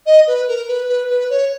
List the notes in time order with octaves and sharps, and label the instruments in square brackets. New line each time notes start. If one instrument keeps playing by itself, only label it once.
[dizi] D#5
B4
A#4
B4
B4
B4
C#5